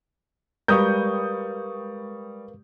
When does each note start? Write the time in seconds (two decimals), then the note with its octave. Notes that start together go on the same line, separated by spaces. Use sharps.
0.68 G3 G#3 A#4 B4 F5 C#6 D#6 G6